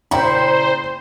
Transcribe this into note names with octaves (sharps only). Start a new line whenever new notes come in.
A#2 C#3 E4 C5 G5 A#5 B5